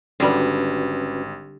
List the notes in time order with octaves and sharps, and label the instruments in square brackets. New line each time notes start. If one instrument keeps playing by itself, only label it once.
[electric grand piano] G#1 [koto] D3 G3 [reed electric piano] C#4 F#4 B4